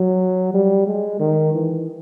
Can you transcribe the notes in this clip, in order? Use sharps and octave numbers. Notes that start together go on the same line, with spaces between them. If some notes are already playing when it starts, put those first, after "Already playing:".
Already playing: F#3
G3
G#3
D#3
E3